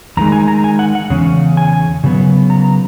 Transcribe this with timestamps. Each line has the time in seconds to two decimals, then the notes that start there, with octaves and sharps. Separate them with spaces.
0.17 E2 D#3 G#3 A#5
0.32 G#5
0.48 A#5
0.64 G#5
0.79 F#5
0.95 F#5
1.10 E2 C#3 C#4
1.57 G#5
2.04 C#3 F#3 B3
2.50 A#5